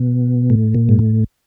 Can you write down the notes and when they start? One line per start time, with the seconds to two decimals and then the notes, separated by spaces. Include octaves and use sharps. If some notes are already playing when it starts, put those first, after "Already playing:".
Already playing: B2
0.50 A2
0.74 A#2
0.89 G#2
0.99 A2